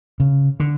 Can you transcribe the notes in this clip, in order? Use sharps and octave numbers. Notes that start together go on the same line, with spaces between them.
C#3
D3